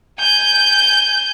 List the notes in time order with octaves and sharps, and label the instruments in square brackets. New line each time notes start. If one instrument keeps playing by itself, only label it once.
[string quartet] G#5 G6